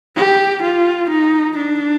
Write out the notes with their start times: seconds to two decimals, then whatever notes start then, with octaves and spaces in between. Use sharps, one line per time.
0.16 G4
0.62 F4
1.10 D#4
1.57 D4